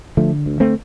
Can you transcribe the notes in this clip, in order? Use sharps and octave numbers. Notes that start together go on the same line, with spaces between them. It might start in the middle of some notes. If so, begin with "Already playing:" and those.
D3 F3 A3
D2
A3 C4